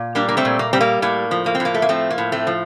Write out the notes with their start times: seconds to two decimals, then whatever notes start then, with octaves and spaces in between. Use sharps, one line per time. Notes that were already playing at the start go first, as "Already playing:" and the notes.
Already playing: A#2
0.15 G3 A#3 D4
0.29 A#3
0.37 A3 C4
0.45 A#2
0.59 A#3
0.73 G3 C4
0.81 A#3
1.02 A2 A#3
1.31 F3
1.46 A#3
1.55 C4
1.60 A2
1.65 A#3
1.74 A3
1.82 A#3
1.89 F3 A3 C4
2.10 A#3
2.18 A2
2.32 A3 C4
2.47 F3